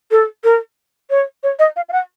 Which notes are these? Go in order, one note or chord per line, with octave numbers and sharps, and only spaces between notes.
A4
A#4
C#5
C#5
D#5
F5
F5
F#5